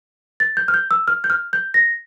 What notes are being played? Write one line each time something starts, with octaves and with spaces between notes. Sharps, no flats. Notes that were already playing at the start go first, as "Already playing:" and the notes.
A6
G6
F6
G6
E6
F6
G6
F6
G6
A#6